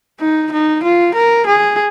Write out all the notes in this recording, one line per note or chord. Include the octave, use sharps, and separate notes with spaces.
D#4
D#4
F4
A#4
G#4